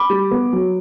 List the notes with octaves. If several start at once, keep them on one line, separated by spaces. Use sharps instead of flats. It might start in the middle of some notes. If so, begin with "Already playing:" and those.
Already playing: B5 D6
G3
B3
F#3